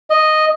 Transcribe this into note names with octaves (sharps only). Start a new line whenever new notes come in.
D#5